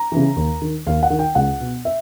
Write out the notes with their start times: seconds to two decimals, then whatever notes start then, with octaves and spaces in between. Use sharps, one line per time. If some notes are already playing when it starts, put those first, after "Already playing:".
Already playing: A#5
0.12 C#3 E3
0.36 D#2
0.62 D#3
0.87 D#2 F5
1.03 F#5
1.10 D#3
1.19 G5
1.35 C#2 F#5
1.60 B2
1.85 E5